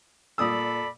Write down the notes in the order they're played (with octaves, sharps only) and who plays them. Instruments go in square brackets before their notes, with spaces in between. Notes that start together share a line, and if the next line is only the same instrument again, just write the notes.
[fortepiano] A#2 D#6 E6 [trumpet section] A4 D5 B5